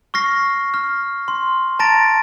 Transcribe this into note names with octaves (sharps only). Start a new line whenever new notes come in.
C#6 F6 A#6 C7
F6
C6
A5 A#5 A6 A#6 D7